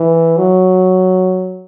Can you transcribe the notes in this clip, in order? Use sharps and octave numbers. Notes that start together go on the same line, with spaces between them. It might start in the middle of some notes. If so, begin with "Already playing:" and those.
Already playing: E3
F#3